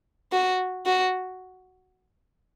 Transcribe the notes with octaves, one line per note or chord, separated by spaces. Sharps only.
F#4
F#4